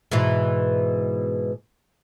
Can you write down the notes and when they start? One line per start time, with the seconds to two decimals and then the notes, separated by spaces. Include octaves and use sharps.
0.11 G#2 B2 E3